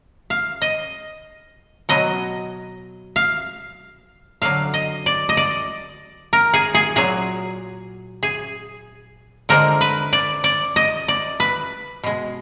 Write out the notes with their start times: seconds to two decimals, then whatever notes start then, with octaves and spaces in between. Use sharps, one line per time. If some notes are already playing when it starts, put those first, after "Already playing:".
0.30 F5
0.62 D#5
1.89 B2 F#3 D#5
3.16 F5
4.42 D3 F#3 F5
4.74 D#5
5.06 D5
5.29 D#5
5.37 D5
6.33 A#4
6.54 G#4
6.75 G#4
6.96 A#2 F#3 G#4
8.23 G#4
9.49 D3 F3 G#3 A#4
9.81 B4
10.13 D5
10.44 D5
10.76 D#5
11.08 D5
11.40 B4
12.04 B2 G#3